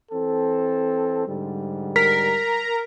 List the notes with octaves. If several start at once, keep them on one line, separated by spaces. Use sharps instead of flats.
E3 C4 A4
G#2 D3 G3
A#4 B6